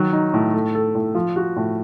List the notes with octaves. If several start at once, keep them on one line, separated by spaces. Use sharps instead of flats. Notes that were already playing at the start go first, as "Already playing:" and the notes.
Already playing: D#3 F#3
D#4
A2
A3
A4
A2
F3
F#4
A2